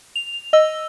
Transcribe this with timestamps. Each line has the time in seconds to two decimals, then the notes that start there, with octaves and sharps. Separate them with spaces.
0.16 F7
0.53 D#5 E6